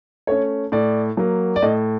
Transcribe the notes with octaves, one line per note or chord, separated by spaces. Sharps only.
A3 C#4 C#5
A2 D5
F#3 A#3
D5
A2 D#5